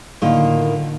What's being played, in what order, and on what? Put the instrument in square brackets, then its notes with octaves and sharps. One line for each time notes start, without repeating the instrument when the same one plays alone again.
[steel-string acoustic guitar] A2 D#3 A#3 [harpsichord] D3 F4